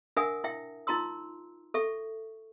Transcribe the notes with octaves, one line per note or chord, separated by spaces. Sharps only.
D4 A#4 E5 F#5 G#5 D#6
E4 E5 G5
D#4 F4 A#5 C6 E6
A4 E5 C#6